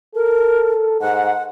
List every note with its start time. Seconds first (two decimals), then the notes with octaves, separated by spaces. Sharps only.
0.15 A4 A#4
1.01 G#2 F#5